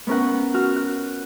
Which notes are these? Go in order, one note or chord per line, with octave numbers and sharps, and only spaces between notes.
B3 C#4 A#4 F#5
F#4 F6
F#6